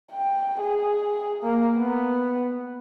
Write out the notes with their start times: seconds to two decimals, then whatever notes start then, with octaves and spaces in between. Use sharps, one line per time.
0.12 G5
0.60 G#4
1.43 A#3
1.77 B3